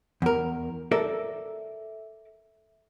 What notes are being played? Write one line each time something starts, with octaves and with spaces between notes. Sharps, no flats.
E2 A#4
A4 A#4 D5 E5